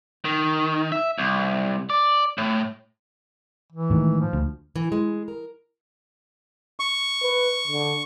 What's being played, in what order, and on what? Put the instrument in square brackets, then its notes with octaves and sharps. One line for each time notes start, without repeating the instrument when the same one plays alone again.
[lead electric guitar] D#3
E5
C2
D5
A2
[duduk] E3
[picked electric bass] A2 D#3 G#3
[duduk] F3
[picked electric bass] D2
[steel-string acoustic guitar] E3
G#3
A#4
[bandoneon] C#6
[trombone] B4
D3